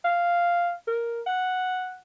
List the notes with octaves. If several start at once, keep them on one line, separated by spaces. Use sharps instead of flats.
F5
A#4
F#5